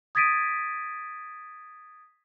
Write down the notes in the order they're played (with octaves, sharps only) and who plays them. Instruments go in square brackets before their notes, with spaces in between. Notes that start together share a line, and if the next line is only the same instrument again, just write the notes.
[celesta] D#6 G#6 A6 B6 D7 D#7